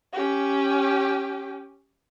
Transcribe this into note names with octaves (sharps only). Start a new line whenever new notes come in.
C#4 G4